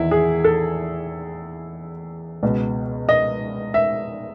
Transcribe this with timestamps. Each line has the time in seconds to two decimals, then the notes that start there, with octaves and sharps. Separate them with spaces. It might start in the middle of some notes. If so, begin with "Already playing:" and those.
Already playing: E2 D#3 E4
0.11 G#4
0.44 A4
2.43 C#2 B2
3.09 D#5
3.74 E5